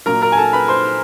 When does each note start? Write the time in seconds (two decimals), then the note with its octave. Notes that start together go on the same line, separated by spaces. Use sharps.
0.06 A#2 F#3 A#4 A#5
0.22 A#4 A#5
0.32 G#5
0.38 A4 A5
0.53 B4 B5
0.68 C5 C6